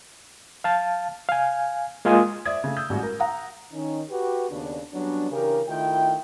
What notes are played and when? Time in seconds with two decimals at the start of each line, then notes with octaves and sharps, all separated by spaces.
0.64 F5 A5
1.29 F5 G#5
2.05 G#3 A#3 F4 D#5 G#5 D#6
2.45 C5 D5 E5 D#6 G#6
2.64 C#3 A3
2.76 D#6 E6 G6
2.89 A1 G3 G#3 F#4
3.03 A#4
3.19 F#5 A#5 D#6
3.73 D#3 C#4 D#4
4.10 F#4 G4 B4
4.50 D#2 C#3 B3 D4
4.93 F#3 G3 B3 C#4 D4
5.32 C#3 E3 D4 G4 A#4
5.67 D#3 A3 E4 F4 G5